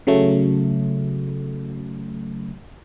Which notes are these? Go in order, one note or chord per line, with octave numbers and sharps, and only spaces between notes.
C#3 F#3 A3